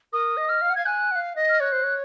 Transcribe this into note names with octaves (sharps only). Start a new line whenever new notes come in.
A#4 D#6
D#5
F6
F5
F#5
F5 G#6
G#5 F#6
F#5
F5
D#5
F6
C#5 F#6
C5
C#5